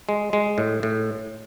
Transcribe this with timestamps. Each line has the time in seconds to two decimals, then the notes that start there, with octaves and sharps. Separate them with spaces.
0.09 G#3
0.33 G#3
0.58 A2
0.83 A2